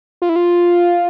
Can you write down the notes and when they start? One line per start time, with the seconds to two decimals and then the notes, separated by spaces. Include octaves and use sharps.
0.22 F4
0.29 E4
0.36 F4